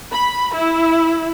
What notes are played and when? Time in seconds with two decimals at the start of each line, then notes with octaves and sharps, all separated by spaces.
0.12 B5
0.55 E4